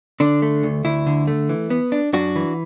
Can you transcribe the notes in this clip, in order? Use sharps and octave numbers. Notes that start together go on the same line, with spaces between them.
D3 D4
A3
D2
D2 E4
D3
A3
E3
B3
D4
F#2 D4 F#4
E3